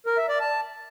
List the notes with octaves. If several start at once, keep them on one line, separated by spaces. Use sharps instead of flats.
A#4
E5
D5
A5